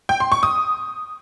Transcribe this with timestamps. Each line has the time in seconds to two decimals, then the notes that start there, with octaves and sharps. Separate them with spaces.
0.09 G5
0.20 C6
0.32 C#6
0.43 D#6